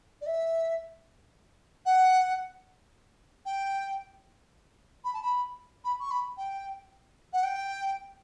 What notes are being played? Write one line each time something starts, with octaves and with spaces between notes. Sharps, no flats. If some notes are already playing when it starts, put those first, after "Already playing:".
D5
E5
F#5
G5
B5
A5
B5
B5
C#6
B5
G5
F#5
G5